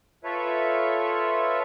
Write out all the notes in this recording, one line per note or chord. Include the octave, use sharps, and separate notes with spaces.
F4 A4 B4 C#5 E5